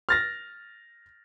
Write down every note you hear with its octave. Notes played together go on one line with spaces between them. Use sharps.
F6 A6 A#6